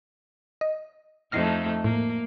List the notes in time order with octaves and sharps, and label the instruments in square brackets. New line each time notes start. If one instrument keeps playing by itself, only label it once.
[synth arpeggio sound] D#5
[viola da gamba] F2 A3 D#4 [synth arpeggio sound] F6 A#6 C7
[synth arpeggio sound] A2 [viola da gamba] A#3